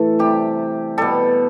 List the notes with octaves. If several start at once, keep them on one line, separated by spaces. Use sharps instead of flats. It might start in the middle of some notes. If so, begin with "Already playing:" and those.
Already playing: A2 E3 A3 A4
C3 G3 G4
B2 G3 A4